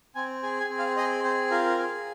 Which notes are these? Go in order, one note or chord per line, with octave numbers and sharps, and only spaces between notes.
C4 G#5
G#4 G#5
G#5
C4
F5
G#4 D#5
C4 C5
F4 A#4
G#4